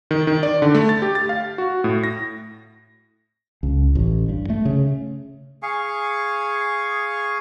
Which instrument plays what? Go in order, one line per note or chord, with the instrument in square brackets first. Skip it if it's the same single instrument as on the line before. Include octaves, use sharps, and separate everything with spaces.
[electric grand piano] D#3
D#3
D5
D3
A3
A6
G4
A6
F5
F#4
A2
A#6
[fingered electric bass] C#2
A1
G2
A3
C#3
[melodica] G#4 F5 G#5 C#6